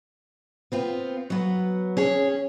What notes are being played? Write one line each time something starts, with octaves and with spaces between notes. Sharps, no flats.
B3 C4 F4
F#3 B3
C#4 G#4 C#5